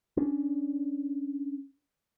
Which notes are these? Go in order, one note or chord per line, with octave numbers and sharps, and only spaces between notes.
C#4 D4